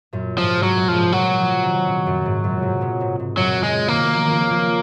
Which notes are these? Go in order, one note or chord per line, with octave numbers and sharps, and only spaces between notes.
F#2 A#2
G#2 C3 F3
G#2
F#3
F#2 A#2
F3
G#2 C3
A#2 C#3 F#3
C#3 F3
C3 D#3
A#2 C#3
F#2 A#2
G#2
F#2 A#2
G#2 C3
A#2 C#3
G#2 C3
G#2
F#2 A#2 F#3
A#2 C#3 G#3
C3 D#3 A#3
C#3 F3
D#3
C#3 F3
C#3 F3